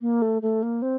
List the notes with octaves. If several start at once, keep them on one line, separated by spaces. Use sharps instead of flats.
A#3
A3
A3
A#3
C4